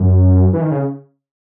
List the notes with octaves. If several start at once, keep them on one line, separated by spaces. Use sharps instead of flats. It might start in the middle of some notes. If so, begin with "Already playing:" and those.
Already playing: F#2
E3
D#3
C#3